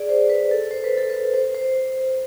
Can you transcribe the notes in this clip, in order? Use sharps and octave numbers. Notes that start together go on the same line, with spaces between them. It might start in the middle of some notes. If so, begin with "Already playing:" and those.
Already playing: G#4 D5
C5
B4
A4
C5
B4
A4
B4
C5
C5